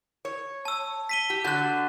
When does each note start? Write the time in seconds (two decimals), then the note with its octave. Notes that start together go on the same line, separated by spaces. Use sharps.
0.25 C#5
0.65 A5 E6
1.09 B6 D#7 G7
1.30 G4
1.44 D3 F#3 F#4 F#6 G6